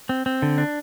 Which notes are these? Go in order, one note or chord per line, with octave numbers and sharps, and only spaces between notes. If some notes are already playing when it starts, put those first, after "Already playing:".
C4
C4
D3
D4